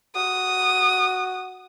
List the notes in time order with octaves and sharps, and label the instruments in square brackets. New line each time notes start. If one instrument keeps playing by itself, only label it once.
[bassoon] F#4 [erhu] D#6